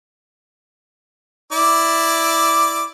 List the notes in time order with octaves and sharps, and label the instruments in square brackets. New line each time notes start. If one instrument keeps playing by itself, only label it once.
[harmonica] E4 D5 D6